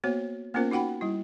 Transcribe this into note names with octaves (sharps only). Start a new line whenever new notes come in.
A#3 B3 F#4 C5 C#5
A#3 B3 C#4 F4 A#4 C5
D#4 F#4 F#5 G5 B5
G3 E4